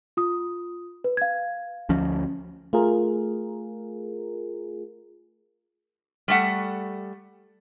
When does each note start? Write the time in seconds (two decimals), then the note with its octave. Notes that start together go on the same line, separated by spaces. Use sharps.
0.17 F4 D#6
1.04 B4
1.17 F5 G#6
1.89 D2 F3 C#4
2.73 A3 F4 G#4 A#4
6.28 G3 A3 F#5